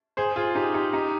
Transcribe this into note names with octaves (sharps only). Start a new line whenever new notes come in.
G#4 C5
F4 G#4
D#4 G4
D#4 G4
D#4 G4